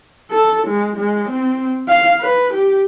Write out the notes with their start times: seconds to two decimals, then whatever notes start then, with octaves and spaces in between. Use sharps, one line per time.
0.31 A4
0.67 G#3
0.97 G#3
1.29 C4
1.88 F5
2.21 B4
2.54 G4